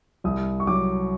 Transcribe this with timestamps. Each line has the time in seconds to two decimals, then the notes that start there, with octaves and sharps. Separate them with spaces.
0.24 C2 D#6
0.60 C#6
0.67 F#3 D6